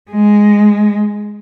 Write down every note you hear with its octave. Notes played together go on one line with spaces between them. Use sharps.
G#3